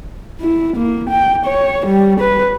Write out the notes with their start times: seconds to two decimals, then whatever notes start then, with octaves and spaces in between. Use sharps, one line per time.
0.41 E4
0.76 A#3
1.09 G5
1.46 C#5
1.86 G3
2.20 B4